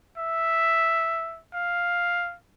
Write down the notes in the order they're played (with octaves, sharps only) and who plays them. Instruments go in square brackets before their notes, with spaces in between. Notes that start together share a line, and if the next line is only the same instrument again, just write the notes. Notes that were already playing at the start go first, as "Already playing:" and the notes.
[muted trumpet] E5
F5